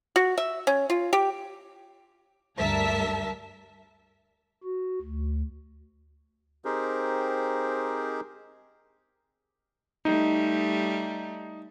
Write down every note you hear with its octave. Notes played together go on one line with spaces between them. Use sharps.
F#4
E5
C#4
F4
G4
D2 G2 A#4 E5 A5 B6
F#4
D2
C4 D#4 G4 G#4 A#4 C5
G3 A3 D#4